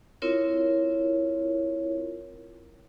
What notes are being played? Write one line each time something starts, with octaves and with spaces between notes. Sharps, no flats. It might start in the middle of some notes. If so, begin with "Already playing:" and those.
C4 E4 F4 A#4 C#5